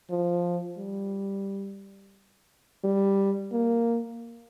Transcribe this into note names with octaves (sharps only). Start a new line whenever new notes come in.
F3
G3
G3
A#3